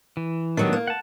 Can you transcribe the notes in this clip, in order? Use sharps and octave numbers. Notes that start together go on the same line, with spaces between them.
E3
D#3 F#3 G3 B3 D4
A#3
F#5 A5